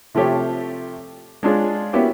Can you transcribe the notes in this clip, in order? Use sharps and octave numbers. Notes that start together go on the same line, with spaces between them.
C3 F3 A3 G4 C#5
G#3 C#4 D4 F4 G#4
A#3 B3 C#4 E4 F#4 G4